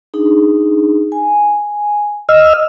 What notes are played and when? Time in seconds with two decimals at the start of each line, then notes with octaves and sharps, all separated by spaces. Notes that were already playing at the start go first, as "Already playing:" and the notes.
0.14 D4 D#4 G#4
1.12 G#5
2.29 D#5 E6 F6